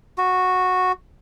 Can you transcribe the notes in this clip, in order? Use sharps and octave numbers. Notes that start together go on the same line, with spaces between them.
F#4